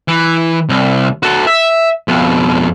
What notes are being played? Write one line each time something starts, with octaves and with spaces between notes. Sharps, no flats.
E3
C2
F#4 A4
E5
F2 B2